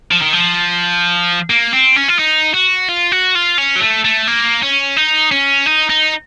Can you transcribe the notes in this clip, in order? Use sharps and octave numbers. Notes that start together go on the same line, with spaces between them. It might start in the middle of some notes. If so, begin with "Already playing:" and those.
F3
D#3
F3
A#3
C4
C#4
F4
D#4
F#4
F4
F#4
F4
C#4
F#3
A3
A3
A#3
C#4
D#4
C#4
D#4
D#4